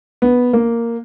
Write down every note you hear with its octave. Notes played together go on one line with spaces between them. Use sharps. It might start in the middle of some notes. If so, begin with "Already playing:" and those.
B3
A#3